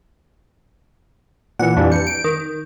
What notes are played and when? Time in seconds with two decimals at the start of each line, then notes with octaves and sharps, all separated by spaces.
1.59 A#2 E3 F#5
1.77 F2 E3 G3 D4
1.92 G6 C#7
2.07 D7
2.24 D#3